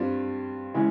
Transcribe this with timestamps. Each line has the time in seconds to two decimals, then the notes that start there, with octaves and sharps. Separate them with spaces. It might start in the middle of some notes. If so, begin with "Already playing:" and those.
Already playing: G2 G3 C4 F4
0.74 C#3 E3 G#3 E4